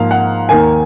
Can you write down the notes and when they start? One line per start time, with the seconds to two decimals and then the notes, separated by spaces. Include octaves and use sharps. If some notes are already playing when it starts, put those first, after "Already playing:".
Already playing: G#2 F3 A#3 F5
0.11 F#5
0.49 D#2 D#3 A#3 G#5